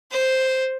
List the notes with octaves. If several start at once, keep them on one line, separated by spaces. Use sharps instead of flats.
C5